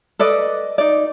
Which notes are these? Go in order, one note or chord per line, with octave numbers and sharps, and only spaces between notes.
A4 B4 D5 D#5
D#4 D5